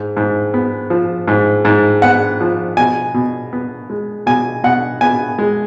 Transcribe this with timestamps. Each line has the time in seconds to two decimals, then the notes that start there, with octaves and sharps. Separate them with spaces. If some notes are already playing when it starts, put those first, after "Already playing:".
Already playing: G#2
0.17 G#2
0.54 B3
0.90 F3
1.28 G#2
1.65 G#2
2.02 B3 F#5
2.41 F3
2.77 B2 G#5
3.14 B2
3.53 B3
3.90 G#3
4.26 B2 G#5
4.64 B2 F#5
5.01 B3 G#5
5.39 G#3